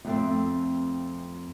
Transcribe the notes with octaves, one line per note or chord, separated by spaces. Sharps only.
F2 A3 C4